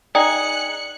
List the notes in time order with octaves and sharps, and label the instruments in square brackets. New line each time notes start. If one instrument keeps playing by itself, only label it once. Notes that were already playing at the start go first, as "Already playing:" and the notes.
[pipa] D#4 G#4 [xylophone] D5 G5 [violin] F#6 C#7